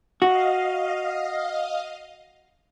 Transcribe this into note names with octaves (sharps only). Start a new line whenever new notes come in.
F#4 D#5 F5